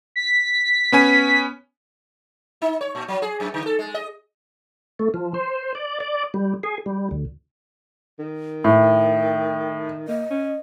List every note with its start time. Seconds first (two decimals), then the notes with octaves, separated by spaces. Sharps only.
0.16 B6
0.92 B3 C#4 G#5
2.62 D#4
2.81 C#5
2.95 A#2
3.08 F#3
3.22 G#4
3.40 F#2
3.54 D3
3.66 A4
3.79 G#3
3.94 D#5
4.99 A3
5.14 F3
5.34 C5
5.75 D5
6.00 D5
6.34 G3
6.63 G#4
6.86 G3
7.11 D2
8.19 D#3
8.64 A2 G5
10.08 A#3 D#5
10.30 C#4